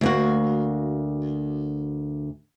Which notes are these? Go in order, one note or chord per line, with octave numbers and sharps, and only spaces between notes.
D2 A#3 F#4